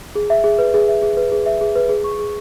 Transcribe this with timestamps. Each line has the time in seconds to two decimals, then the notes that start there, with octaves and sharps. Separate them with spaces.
0.15 G#4
0.30 E5
0.44 G#4
0.59 B4
0.74 G#4
0.89 E5
1.03 G#4
1.17 B4
1.32 G#4
1.46 E5
1.61 G#4
1.76 B4
1.89 G#4
2.04 C#6
2.19 G#4